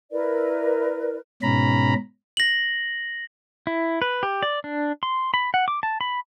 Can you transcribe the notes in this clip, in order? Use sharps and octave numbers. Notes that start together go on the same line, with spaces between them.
E4 A#4 B4 D5
G#2 B2 C#4 A#5 B5
A#6 F#7
E4
B4
G4
D5
D4
C6
B5
F#5
D6
A5
B5